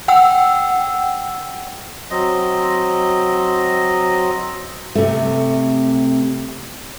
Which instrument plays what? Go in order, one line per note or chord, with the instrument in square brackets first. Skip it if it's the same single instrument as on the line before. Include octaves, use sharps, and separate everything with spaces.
[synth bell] F#5 G5 E6
[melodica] F#3 C4 D#5
[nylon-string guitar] C3 A3